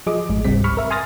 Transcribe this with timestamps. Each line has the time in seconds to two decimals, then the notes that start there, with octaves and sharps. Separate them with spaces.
0.07 F3 G#4 D#5 D6
0.29 A1 G#2
0.45 G1 C#2 C3 G3 C4 B6
0.64 B5 C#6 F6
0.77 A#4 E5
0.91 G#5 C6 D#6 F6 A6 A#6